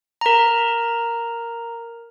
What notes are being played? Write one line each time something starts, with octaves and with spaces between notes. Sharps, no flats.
A#4 A#5